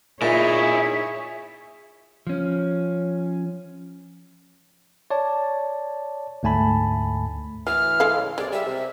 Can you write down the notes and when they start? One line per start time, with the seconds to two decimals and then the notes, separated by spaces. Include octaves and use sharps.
0.22 A#2 D#4 E4 G#4 C#5 E5
2.27 F3 C#4
5.10 C#5 D5 A5
6.43 D2 G#2 A3 G#5 A5 B5
7.67 E3 F#3 F6
8.00 G#3 A4 F5
8.16 C#3
8.38 C2 G#3 D5
8.52 G3 E5
8.66 C3